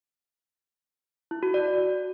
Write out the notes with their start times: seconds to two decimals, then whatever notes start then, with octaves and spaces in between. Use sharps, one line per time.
1.31 E4
1.43 F#4
1.54 D5